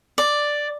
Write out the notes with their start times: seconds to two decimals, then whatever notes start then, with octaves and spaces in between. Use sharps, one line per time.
0.18 D5